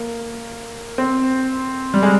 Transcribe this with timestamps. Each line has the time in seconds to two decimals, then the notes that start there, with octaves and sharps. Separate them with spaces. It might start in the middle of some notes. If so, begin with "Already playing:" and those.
Already playing: A#3
0.98 C4
1.94 G3
2.03 G#3